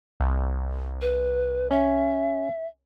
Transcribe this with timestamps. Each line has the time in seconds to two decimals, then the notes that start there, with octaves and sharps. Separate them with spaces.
0.20 C2
1.01 B4
1.71 C#4 E5